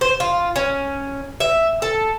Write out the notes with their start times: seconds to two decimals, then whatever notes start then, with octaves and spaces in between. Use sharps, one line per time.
0.01 C5
0.20 F4
0.56 C#4
1.40 E5
1.82 A4